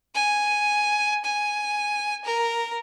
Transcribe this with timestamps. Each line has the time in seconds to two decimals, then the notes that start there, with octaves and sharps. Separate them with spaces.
0.15 G#5
1.25 G#5
2.25 A#4